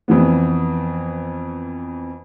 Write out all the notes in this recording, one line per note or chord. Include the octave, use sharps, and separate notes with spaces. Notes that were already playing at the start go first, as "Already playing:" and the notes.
F2 E3 B3